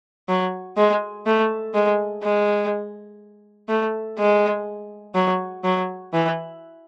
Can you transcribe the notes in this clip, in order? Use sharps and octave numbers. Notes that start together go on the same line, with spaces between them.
F#3
G#3
A3
G#3
G#3
A3
G#3
F#3
F#3
E3